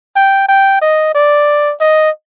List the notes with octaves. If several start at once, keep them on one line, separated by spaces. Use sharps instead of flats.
G5
G5
D#5
D5
D#5